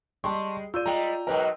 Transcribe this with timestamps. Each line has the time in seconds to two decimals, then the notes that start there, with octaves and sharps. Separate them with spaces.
0.24 G3 G#3 G4 G5 A5 C6 C#6
0.74 F4 D5 E6 G6 D#7
0.86 G3 G#3 G5 A#5
1.27 G#2 B2 F#3 A#4 B4 G5